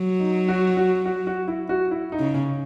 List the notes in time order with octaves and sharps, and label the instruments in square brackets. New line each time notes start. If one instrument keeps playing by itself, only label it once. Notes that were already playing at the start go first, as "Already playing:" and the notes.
Already playing: [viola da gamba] F#3
[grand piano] D#4
F#4
F#4
F#4
F#4
E4
F#4
E4
D#4
[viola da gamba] C#3
[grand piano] C#4